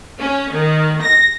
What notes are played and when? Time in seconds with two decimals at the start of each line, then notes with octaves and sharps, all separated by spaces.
0.19 C#4
0.51 D#3
1.01 A#6